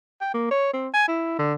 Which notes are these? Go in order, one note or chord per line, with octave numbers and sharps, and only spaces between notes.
G5
A#3
C#5
C4
G#5
E4
D3